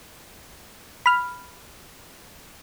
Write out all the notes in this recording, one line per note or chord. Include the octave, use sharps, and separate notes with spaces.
B5 F6